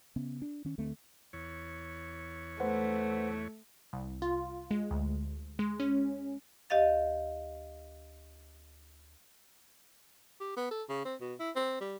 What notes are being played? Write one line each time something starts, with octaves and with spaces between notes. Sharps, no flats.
C#3 B3 C#4
D4
D#3 C#4
D2 D3 A3 C4
E2 C#5
A3 B4 C5 F#5
C2
F4
G#3
D2
G#3
C#4
D2 G4 D#5 F5 A6
G4
B3
A4
C#3
C4
B2
E4
C4
G3